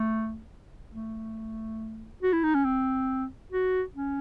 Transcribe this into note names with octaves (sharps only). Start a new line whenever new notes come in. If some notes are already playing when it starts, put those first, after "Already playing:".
Already playing: A3
A3
F#4
E4
D#4
C#4
C4
F#4
C#4